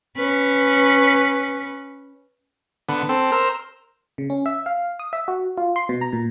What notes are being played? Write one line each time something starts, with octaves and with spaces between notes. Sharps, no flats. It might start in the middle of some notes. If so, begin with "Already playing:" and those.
C#4 B4
D3 B3
C4 A4
A#4 C5 E6
C#3
C#4
E5
F5
D#6
E5
F#4
F4
C6
B2
A#5
A#2